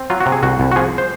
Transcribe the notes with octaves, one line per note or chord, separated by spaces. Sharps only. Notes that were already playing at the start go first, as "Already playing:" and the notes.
Already playing: C4
F#3 F4
F#4
C3
G#4
C2 F#4
C2
F#4
F3 G#4
C5